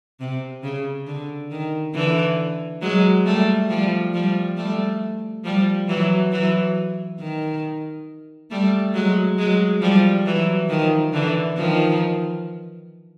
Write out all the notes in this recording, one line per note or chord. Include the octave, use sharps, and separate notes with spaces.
C3
C#3
D3
D#3
D3 E3
F#3 G#3
G3 A3
F3 G3
F3 G3
G3 A3
F3 G3
E3 F#3
E3 F#3
D#3
G3 A3
F#3 G#3
F#3 G#3
F3 G3
E3 F#3
D#3 F3
D3 E3
D#3 F3